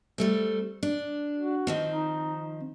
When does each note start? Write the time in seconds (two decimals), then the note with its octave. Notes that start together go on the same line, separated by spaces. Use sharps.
0.18 G3 A3 C4
0.83 D4
1.39 F#4
1.67 D#3 F3 C4
1.91 D#4